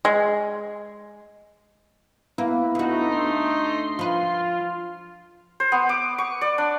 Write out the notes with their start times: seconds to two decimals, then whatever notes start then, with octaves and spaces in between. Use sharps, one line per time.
0.05 G#3
2.38 A#3 B3 E4
2.75 D2 A3 D#4 F#4
3.12 C6
3.99 F3 F4 B4
5.60 C5
5.72 B3
5.89 D6
6.18 C#6
6.41 D5
6.58 D4